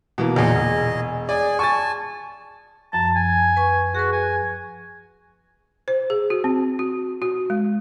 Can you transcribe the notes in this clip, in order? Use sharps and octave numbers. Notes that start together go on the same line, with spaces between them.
B2 E3 A#3
E2 A#2 G#4 D#5
E1
G#4 D5 G#5
G#5 A5 C#6 A6
F#2 F3 A5
G#5
B4 C#6
F#4 G#4 B4
G#5
C5
G#4
F#4
C4
F#4
F#4
G#3